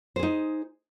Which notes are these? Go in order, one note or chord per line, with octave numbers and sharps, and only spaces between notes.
D#4 G#4 C5